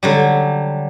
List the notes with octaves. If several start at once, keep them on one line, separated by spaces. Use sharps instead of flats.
D3 F#3 G3